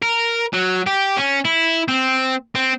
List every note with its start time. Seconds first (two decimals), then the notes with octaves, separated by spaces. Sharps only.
0.02 A#4
0.53 F#3
0.87 G4
1.17 C#4
1.45 E4
1.88 C4
2.55 C4